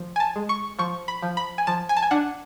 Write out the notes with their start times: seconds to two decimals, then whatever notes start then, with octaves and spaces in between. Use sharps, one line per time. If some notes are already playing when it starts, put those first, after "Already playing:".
Already playing: F3
0.16 G#5
0.20 A5
0.36 G#3
0.49 C#6
0.79 F3 C#6
1.08 B5
1.22 F3
1.37 B5
1.58 G#5
1.67 F3 A5
1.89 G#5
1.96 A5
2.02 G#5
2.11 D4 F#5